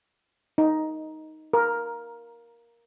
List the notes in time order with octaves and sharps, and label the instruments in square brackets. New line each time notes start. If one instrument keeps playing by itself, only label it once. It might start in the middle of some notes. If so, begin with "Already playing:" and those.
[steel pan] D#4
A#4